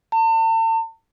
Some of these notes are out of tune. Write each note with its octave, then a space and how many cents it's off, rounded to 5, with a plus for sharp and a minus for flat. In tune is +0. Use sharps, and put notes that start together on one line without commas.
A5 +40